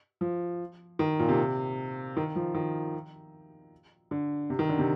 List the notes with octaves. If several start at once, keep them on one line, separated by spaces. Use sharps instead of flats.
F3
D#3
A#2
C3
D#3
F3
D#3
D3
C3
D#3
D3
C3